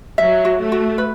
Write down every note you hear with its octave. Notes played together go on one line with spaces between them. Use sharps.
F#3 E5
F#4
A3
F#4
B4